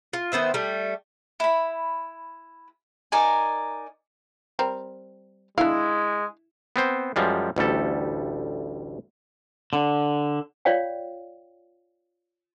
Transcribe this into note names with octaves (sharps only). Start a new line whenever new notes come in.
F4
D#3 B3 C5 E5
G3 A3
E4 B5
D#4 A#4 D5 G#5
G3 C4 A#4
G#3 D4 E4 F5
B3 C4 C5
F#2 F3 G3 G#3
A1 D2 G3 A4
D3
F4 C#5 D5 F5 G5